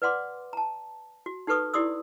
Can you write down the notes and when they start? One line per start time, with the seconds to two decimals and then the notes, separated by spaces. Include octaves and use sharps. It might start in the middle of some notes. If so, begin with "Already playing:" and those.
0.02 B4 D5 F#5 C6 D6
0.53 A5 A#5
1.26 F#4
1.47 D#4 G4 A4 B4 C#6 D#6
1.74 E4 G4 D5 C6 D#6 E6